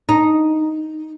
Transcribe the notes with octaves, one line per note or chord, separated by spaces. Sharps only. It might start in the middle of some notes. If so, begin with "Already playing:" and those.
D#4